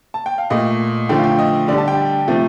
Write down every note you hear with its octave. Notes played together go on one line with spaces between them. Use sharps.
A5
G5
F5
A#2 A3 D#5
D3 F3 A3 G5
F5
G5
D#5
D3 G3 D5
A5
G5
C3 F3 A3